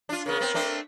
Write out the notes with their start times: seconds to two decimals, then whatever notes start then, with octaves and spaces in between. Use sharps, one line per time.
0.09 D4 F4
0.26 C#3 B3 A#4
0.41 B3 C4
0.54 A3 C4 D4